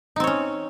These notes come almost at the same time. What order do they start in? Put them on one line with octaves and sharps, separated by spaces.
D#4 C4 C#5 C#4